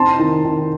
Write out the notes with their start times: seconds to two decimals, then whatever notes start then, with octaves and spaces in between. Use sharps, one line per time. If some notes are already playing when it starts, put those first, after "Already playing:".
Already playing: C4 D#4 A5 C6
0.19 D#3
0.45 D#3